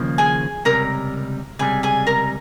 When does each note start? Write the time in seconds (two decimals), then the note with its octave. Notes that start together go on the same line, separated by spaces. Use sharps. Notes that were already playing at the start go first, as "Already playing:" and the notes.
Already playing: D#2 C#3 F3 A#3
0.18 G#4 G#5
0.65 C#2 C3 G3 A#4 A#5
1.59 C#2 C3 G3 G#4 G#5
1.83 G#4 G#5
2.07 A#4 A#5